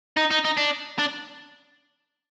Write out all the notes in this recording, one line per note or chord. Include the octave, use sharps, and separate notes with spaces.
D#4
D#4
D#4
D4
D4